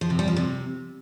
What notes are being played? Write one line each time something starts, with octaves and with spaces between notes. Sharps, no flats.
F3
C3
G3
F3
C3